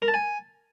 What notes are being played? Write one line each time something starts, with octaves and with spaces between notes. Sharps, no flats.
A#4
A5
G#5